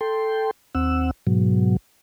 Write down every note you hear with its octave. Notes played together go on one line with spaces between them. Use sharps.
A4 G5 C6
D#2 C4 F#5 E6
G#2 B2 F#3